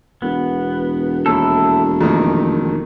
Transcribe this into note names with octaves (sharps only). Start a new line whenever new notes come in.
E1 B3
D#2 E4 A4
F2 A#2 D#3 A3